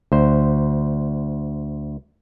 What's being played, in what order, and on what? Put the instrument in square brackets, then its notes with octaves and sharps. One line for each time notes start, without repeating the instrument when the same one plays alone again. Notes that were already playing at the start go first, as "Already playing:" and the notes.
[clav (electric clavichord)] D2 C5